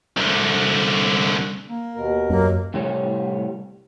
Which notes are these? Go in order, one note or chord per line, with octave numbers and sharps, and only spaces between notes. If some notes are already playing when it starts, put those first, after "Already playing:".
C2 D3
A#3
D#2 B2 A#4
F#2 F#3 A#3
A2 C3 G3 A3 C#5